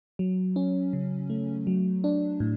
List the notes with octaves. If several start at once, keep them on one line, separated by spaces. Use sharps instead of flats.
F#3
C#4
C#3
A3
F#3
D4
A2